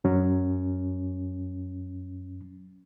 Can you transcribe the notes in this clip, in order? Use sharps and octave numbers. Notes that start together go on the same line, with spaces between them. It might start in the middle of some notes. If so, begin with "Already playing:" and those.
F#2 F#3 C#4